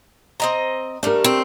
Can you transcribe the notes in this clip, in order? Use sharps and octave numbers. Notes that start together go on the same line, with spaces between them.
C4 D#5 A#5
G3 A3 D4 A#4
C4